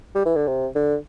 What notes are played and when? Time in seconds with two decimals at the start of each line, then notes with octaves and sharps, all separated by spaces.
0.15 G3
0.25 E3
0.36 D3
0.47 C3
0.75 D3